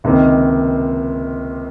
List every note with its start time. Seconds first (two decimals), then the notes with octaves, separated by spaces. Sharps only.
0.04 C#2 C3 D#3 A#3